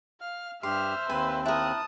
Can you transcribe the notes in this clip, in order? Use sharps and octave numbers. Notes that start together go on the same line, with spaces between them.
F5 F6
G2 G4 C5 E5 C6 F6
D#2 C4 B4 G#5
E4 A#4 A5 D#6 F#6